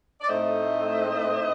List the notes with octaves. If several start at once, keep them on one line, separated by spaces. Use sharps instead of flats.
D5
A2 A3 C4 D#4 C5 D#5